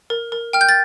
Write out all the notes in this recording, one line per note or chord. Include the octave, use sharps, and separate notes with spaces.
A#4
A#4
G5 F6
G6
A6